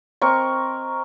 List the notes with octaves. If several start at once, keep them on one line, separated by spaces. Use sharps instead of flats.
C4 A#4 D#5 C#6